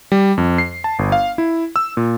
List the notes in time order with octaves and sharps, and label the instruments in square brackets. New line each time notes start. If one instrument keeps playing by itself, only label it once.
[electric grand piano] G3
F2
C7
A5
G1
F5
E4
E6
A#2